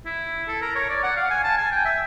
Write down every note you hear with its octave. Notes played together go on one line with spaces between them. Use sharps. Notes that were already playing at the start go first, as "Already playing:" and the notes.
E4
A4
A#4
C#5
D5
F#5
F5
G#5
A5
G#5
G5
E5